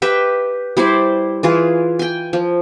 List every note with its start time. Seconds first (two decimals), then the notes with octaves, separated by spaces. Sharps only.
0.02 G4 B4 E5 G5
0.77 G3 E4 C5 D5
1.43 E3 F4 G#4
1.99 G5 G#5
2.33 F3